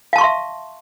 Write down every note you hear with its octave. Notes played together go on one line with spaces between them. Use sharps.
E5 F5 A5 C6 C#6